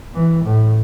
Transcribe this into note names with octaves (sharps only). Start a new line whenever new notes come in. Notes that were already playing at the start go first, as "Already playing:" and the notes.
E3
A2